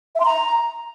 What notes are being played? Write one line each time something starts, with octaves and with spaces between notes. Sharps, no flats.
E5
C6
A#5